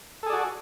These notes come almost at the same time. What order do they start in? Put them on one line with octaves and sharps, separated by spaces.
A4 G#4 D5 F#4